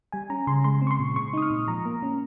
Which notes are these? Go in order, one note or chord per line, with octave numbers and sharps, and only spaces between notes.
G3 G#5
C#4 A#5
C#3 C6
G#3 C6
C4
C#6
C6
A#2
G#3 C#6
D#4 D#6
F6
A#2
F3 A#5
A#3
C#4